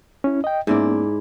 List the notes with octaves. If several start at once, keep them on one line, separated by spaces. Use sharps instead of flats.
C#4 E4
D#5 G5
G#2 A#3 B3 C#4 E4 D5